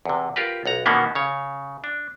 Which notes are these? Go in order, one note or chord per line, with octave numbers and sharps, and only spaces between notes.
E2 C3
F4 G4 A#4 B4
B1 F#5 A#5
B2 D#3 E3 A#3 B3 C#4
C#3 C#5
D4